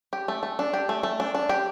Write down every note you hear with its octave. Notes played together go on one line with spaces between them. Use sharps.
G4
A3
A3
D4
G4
A3
A3
D4
D4
G4